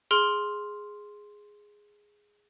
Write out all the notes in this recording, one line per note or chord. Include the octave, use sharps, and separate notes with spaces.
G#4 C6 F6 D7